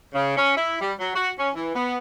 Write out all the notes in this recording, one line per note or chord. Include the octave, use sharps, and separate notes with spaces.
C#3
C#4
E4
G3
F#3
F#4
C#4
E3
B3